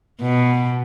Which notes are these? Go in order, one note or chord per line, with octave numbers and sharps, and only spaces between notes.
B2